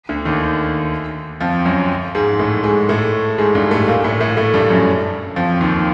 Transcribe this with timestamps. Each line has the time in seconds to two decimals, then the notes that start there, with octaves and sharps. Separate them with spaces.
0.09 D2 D3
0.25 D#2 D#3
1.40 F2 F3
1.65 F#2 F#3
2.15 G#2 G#3
2.39 A2 A3
2.64 G#2 G#3
2.89 A2 A3
3.38 G#2 G#3
3.55 G2 G3
3.71 A2 A3
3.88 A#2 A#3
4.04 A2 A3
4.20 A2 A3
4.37 A2 A3
4.54 G2 G3
4.70 F#2 F#3
5.36 F2 F3
5.61 D#2 D#3